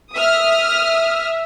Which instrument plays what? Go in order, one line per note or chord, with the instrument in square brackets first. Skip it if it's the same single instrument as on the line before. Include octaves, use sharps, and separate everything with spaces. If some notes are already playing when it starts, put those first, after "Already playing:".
[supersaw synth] E5 [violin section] D#6 F6